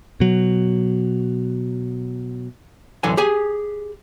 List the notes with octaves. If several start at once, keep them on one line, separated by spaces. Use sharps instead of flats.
B2 F#3
B1 F#2 D3 E3 G#5
G4 G#4 G#5